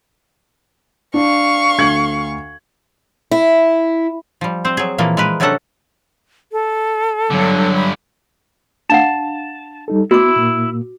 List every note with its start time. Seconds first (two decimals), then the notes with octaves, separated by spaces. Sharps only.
1.14 D4 F5 C#6
1.78 D2 G#6 F#7
3.31 E4
4.41 F3 G3
4.65 C4 C5
4.77 F#3 G#4
4.98 A#2 E3 F3 A#3
5.17 G#3 A#4 B4
5.40 C3 F#3 C#4 D4 A4 F#5
6.52 A4
7.31 G2 D3 F#3
7.75 B5
8.90 D4 F5 F#5 A5
9.88 G3 D#4 A4
10.11 B3 E4 F#4 D6
10.36 A#2 A#3